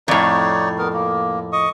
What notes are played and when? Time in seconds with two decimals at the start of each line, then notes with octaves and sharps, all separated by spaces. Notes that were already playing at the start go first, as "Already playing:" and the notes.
0.08 F2 A2 D#4 C#5 D5
0.78 B3 A#4
0.93 A#3
1.52 D#5 C#6 D#6